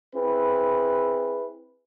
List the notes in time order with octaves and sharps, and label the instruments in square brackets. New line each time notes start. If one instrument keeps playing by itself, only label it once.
[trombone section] C4 E4 G#4 B4